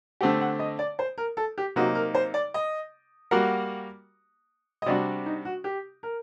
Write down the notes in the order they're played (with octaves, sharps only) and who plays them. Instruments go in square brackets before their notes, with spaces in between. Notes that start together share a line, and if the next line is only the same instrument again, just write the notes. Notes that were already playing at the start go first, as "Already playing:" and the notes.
[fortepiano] D3 A3 C4 G4 [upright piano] F#5
[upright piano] F#5
D#5
D5
C5
A#4
A4
G4
[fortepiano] C3 F#3 A#3 D#4 [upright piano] F#4
[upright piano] A#4
C5
D5
D#5
[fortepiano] G3 A#3 F#4 A#4 [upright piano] F#5
[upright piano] D#5
[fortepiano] C3 G3 D4 F#4 [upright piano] D5
[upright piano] D#4
F#4
G4
A#4